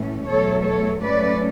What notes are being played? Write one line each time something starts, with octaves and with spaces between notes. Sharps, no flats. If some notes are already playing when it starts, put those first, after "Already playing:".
Already playing: A2 E3 A3 C#4
E2 B2 F#3 A3 A4 C#5
A4 C#5
G#2 F#3 A3 C#4 B4 D5